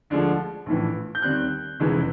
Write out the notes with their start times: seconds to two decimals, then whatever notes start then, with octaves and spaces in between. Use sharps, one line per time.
0.10 D2 D3 F3 G#3
0.66 A#1 A2 E3
1.15 G6
1.22 D#2 D#3 G3 C4 F#6
1.80 F1 E2 C#3 E3 G#3